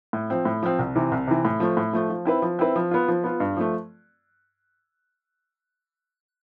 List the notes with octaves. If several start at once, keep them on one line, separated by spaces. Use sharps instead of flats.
A2
F3 C4
A2
F3 C4
C2
C3 E3
C2
C3 E3
A2
F3 A3
A2
F3 A3
F3
C4 E4 B4
F3
C4 E4 B4
F3
B3 F4
F3
B3 F4
G2
F3 A3